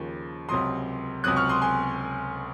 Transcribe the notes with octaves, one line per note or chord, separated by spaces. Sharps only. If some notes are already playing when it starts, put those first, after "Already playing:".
Already playing: D#2 C#3 F3
C#2 C3 F#3 C6 D#6
C#2 C3 F#3 D#6 F#6
C#6 F6
C6 D#6
G#5 C6